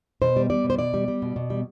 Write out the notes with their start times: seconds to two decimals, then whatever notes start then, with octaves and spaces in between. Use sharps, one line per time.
0.22 B2 C5
0.36 G3
0.50 G3 D5
0.64 B2
0.70 C5
0.79 B2 D5
0.94 G3
1.08 G3
1.22 B2
1.36 B2
1.50 G3